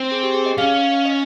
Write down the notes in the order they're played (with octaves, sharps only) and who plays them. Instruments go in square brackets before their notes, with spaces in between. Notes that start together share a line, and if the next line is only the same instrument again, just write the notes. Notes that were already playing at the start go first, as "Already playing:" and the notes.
Already playing: [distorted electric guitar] C4
[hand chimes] G#4
G4
G#4
D#5
[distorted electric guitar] C#4 [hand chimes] F5
[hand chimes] D#5